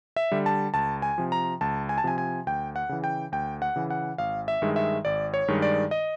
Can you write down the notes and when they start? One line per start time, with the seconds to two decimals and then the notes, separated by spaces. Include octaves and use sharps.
0.16 E5
0.31 D3 G3
0.46 A5
0.74 C#2 A5
1.02 G#5
1.18 C3 F3
1.32 A#5
1.61 C#2 A5
1.89 G#5
1.98 A5
2.04 C3 F3 G#5
2.18 G#5
2.47 D2 G5
2.76 F#5
2.89 C#3 E3
3.04 G5
3.32 D2 G5
3.62 F#5
3.76 C#3 E3
3.90 F#5
4.18 G#1 F5
4.48 E5
4.62 G2 D#3 G#3
4.76 E5
5.05 G#1 D5
5.34 C#5
5.48 G2 D#3 G#3
5.62 D5
5.91 D#5